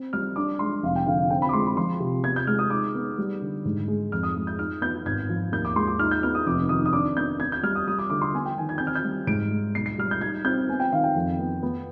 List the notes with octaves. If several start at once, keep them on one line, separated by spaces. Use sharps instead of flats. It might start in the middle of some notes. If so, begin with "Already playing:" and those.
Already playing: C4
G3 F6
D4 D6
G#3 C6
F1 F5
G5
D3 F5
F5
C4 G5
B5
D6
G#3 C6
B5
F3 C6
C3
B3 G#6
G6
G#3 F6
D#6
D#4 D6
B3
G3
D3
G#2
G#3
F2 F6
D#6
G#3
G6
D#4 F6
B3 G6
G#1 G#6
F3
D#2 G6
D6
G#3 C6
D6
D#4 F6
G6
B3 F6
D#6
F1 D6
D#3 D#6
D#6
D4 D6
B3 G6
B3 G#6
G6
G3 F6
D#6
G3 D#6
D6
D3 D6
C6
B3 G#5
G5
D#3 G#5
G#6
C4 G6
F6
G6
G3
G#2 D7
G#3
B1 C7
C7
G3 F6
G6
D#4 G#6
C4 G6
B3 G#5
G5
D#3 F5
G5
F2
B3
B3